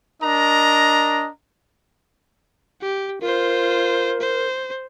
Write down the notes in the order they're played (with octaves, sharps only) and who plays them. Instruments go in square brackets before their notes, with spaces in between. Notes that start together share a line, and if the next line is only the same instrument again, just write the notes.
[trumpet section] D4 A#4 D#5 A#5
[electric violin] G4
[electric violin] F4 C5 [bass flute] A#4
[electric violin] C5